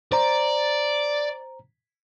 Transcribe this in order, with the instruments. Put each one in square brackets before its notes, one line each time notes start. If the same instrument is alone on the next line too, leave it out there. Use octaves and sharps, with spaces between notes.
[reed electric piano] C5 A#5 [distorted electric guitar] D5